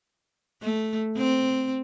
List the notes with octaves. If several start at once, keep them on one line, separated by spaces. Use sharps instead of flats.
A3
C4